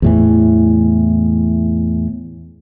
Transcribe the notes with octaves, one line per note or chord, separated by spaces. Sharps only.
E2 A2 E3